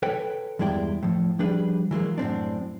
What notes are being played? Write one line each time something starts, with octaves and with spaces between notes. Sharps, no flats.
A4 B4 C#5 G5
E2 G2 G#3 E4 D5 G5
A2 F3
F3 G3 D4 G#4 B4
E3 F#3 G#3 A#3
F#2 A2 C4 D4